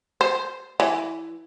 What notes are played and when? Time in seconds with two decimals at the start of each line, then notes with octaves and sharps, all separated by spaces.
0.21 C5
0.80 E3